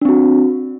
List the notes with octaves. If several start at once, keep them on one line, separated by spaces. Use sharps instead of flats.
C4 D4 F#4